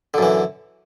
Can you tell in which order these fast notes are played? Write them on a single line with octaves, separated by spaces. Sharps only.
D3 F#2 E3